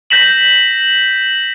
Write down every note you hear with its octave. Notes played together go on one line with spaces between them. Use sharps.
G6 A#6 B6 E7 F#7